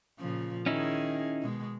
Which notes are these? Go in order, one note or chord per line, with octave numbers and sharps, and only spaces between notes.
A#2 C#3 F3
D#3 C#4 D#4 E4 G#4
B2 G#3